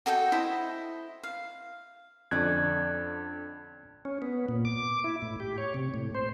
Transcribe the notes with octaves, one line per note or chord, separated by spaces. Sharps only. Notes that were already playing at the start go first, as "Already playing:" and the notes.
F#4 A4 D#5 G5
E4 C5 D#5
F5
F2 D3 C#4 D5 D#5 F#6 G#6
C#4
B3
A#2
D6
E4
A2
G4
C#5
C3
A2
C5